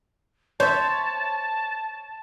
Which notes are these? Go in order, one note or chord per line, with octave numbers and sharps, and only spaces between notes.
C5 C#5 E5 A5